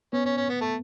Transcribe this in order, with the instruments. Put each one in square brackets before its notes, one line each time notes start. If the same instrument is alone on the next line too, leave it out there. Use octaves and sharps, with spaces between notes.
[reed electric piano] B3 [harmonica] C#4
[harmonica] C#4
C#4
B3
A3